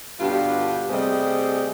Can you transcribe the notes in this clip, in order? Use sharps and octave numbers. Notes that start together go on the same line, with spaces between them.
G2 B2 D3 F4 G4
C3 G3 A3 G#4 C5 D#5